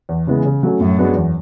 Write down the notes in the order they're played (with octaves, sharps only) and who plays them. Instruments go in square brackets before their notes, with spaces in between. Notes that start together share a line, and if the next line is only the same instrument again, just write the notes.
[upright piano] E2
C#3 E3 G#3 B3
C#3
F#3 A3 C#4
[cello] F#2 [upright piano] A2
[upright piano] G#3 B3 D4 F#4
E2